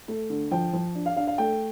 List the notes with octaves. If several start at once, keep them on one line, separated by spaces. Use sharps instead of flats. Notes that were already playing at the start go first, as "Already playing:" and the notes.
A3
D3
F3 G5
F3
D4
F5
D4 F5
F5
A3 G5